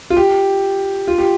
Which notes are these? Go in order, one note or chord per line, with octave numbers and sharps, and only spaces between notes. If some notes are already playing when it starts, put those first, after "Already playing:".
F4
G4
F4
G4